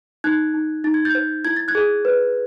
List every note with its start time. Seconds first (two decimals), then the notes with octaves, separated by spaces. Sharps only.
0.24 D#4 F#6 G#6
0.54 D#4
0.84 D#4 A6
0.94 G#6
1.05 G6 A6
1.15 C5
1.45 E4 G#6
1.57 A6
1.68 F#6 G#6
1.75 G#4
2.05 B4